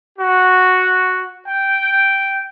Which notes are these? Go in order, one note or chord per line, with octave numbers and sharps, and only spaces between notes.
F#4
G5